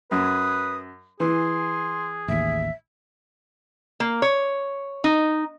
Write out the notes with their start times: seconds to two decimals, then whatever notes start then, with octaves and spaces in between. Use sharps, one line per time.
0.11 F#2 B4 D#6
1.20 E3 G#4 C6
2.28 A1 D#2 E5
4.00 A#3
4.22 C#5
5.04 D#4